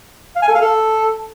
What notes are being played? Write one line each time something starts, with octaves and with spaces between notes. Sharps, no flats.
F5
G#5
A4
F5
A4